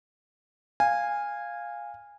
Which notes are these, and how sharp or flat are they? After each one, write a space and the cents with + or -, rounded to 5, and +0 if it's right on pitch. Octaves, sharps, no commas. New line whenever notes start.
F5 +0 G#5 -15